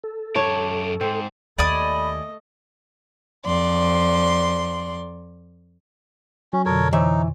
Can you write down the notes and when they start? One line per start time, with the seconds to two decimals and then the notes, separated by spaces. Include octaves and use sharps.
0.04 A4
0.36 F#2 G4 C#5 A5
1.01 G#2 C4
1.58 D#2 A3 D5 D#5 G#5 B5 D#6
3.46 F2 D5 C6
6.53 F#3 C#4
6.66 F2 B2 D3 A4 A#4 C#5
6.93 E3 D#4 C5 C#5 E5